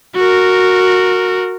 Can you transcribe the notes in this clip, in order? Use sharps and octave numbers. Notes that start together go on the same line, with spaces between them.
F#4 A#4